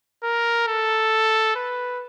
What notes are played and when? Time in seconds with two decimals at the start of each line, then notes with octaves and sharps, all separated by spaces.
0.23 A#4
0.68 A4
1.55 B4